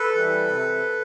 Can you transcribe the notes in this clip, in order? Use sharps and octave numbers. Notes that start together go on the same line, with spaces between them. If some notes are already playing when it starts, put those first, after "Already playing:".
Already playing: A4 B4
E3 G3
C3